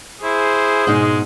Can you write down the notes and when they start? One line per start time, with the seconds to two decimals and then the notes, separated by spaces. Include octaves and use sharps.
0.24 E4 G#4 C5
0.87 G#2 B2 G#3 D#4